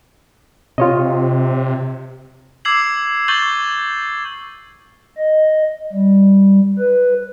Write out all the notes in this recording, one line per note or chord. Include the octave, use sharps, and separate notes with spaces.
C3 F4 C#5 D#5
D6 E6 G#6 C7 F#7
C#6 G6 A6 F#7 G7
D#5
G3
B4